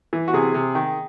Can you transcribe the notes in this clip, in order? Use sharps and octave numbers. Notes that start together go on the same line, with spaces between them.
E3
F#4
C3 G#4
C3
D#3